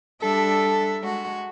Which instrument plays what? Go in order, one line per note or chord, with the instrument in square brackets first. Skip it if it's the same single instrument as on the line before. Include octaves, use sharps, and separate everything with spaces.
[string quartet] G3 D4 E5 [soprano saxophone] A4
[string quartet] G#3 F#4